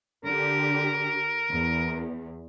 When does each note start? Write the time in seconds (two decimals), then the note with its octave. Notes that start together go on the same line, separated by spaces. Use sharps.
0.25 D3 G4 A#4
1.51 E2